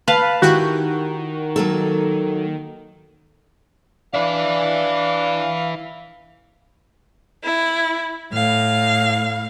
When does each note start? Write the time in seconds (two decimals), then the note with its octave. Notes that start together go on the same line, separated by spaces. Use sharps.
0.08 B4 F5 A5
0.42 D#3 E4 F#4 G4
1.56 F#3 A#3 A4
4.14 D4 E4 B4 F5
7.43 E4
8.33 A2 F5